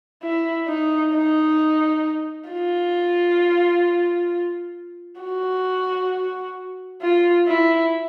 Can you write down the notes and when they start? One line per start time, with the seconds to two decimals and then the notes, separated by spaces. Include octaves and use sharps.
0.23 E4
0.68 D#4
1.14 D#4
2.50 F4
5.21 F#4
7.02 F4
7.48 E4